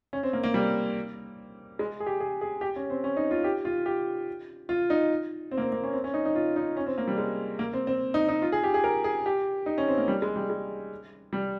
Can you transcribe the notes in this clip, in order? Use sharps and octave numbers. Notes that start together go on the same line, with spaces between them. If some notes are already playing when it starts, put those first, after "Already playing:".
C#4
C4
A#3
A#3
G3
G#3
G#4
G4
G#4
G#4
G4
C#4
C4
C#4
D#4
F4
G4
F4
G4
F4
D#4
C4
A#3
C4
A#3
C#4
C4
C#4
D#4
D#4
F4
D#4
C#4
C4
A#3
G3
G#3
A#3
C4
C4
D#4
D#4
F4
G#4
G4
G#4
A#4
G#4
G4
D#4
C#4
C4
A#3
G3
G#3
G3
G#3
G3